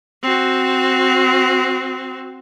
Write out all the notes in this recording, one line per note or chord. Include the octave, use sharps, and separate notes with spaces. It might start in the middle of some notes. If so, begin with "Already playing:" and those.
C4 F#4